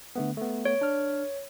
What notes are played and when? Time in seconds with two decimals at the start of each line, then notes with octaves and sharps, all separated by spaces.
0.16 D3 A3 B3
0.37 A3 B3
0.65 C#5
0.81 D4 F6